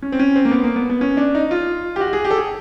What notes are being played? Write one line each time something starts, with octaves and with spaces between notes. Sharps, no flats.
C#4
C4
C#4
C4
A#3
B3
A#3
B3
B3
C#4
D4
D#4
F4
G4
F#4
G4
G#4
G4
A4
G#4